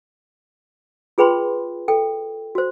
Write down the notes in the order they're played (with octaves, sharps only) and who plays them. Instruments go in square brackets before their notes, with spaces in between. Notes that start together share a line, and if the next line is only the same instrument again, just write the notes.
[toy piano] F4 G#4 B4 G5 B5 C6
A4 G5
F#4 C5